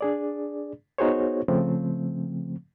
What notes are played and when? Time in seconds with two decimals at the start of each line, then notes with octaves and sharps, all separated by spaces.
0.01 D4 G#4 D5
0.98 B3 D#4 F#4 G#4 C5 C#5
1.48 C#3 F3 A3 C4